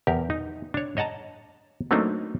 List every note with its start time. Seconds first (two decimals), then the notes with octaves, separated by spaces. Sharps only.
0.07 E2 G4 A#4
0.30 D#4
0.74 D4 C#5
0.97 C#5 D#5 F#5 A5 A#5
1.91 F#3 A3 A#3 C4 D4 D#4